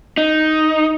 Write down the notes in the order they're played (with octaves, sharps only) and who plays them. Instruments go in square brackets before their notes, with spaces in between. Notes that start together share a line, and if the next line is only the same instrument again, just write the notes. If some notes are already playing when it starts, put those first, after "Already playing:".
[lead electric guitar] D#4